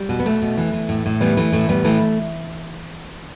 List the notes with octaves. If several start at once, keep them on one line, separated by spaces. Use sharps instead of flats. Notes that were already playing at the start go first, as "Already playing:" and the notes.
Already playing: G3
B2
B3
B2 A3
B2
E3
E3
A2
A2
E3 G3 B3
E3 A3
A2 A3
A2 G3 B3
E3 A3